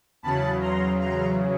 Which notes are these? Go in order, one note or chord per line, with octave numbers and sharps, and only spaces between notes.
E2 C#3 F#3 A5 B5
A#5 C6
A#5 C6